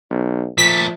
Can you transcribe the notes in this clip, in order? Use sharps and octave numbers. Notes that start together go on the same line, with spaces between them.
B1
A#2 F3 A3 B6